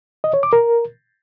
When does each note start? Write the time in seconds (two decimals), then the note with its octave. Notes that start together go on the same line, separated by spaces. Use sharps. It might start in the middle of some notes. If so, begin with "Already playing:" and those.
0.24 D#5
0.34 C#5
0.43 D6
0.53 A#4